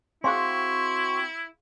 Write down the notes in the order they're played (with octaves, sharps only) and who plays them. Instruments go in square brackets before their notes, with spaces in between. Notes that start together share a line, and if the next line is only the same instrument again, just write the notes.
[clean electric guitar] C4 F#4 [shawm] E4 [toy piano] G#4 F5 C6 [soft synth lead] C#6